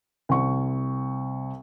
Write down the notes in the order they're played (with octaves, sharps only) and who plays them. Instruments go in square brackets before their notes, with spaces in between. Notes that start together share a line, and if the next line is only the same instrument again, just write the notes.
[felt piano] C2 C#6